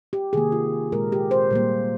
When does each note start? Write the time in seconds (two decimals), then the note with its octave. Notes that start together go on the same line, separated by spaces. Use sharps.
0.13 G4
0.33 C3 D#3 A#3 G#4
0.52 F4
0.92 A#2 G#3 A#4
1.12 G4
1.31 C5
1.51 A#2 G3 A#3